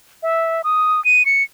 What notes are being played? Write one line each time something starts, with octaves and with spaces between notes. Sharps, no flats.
E5
D#6
D#7
C#7